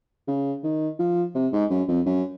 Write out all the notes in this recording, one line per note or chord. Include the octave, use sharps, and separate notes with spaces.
C#3
D#3
F3
C3
G#2
F#2
F2
F#2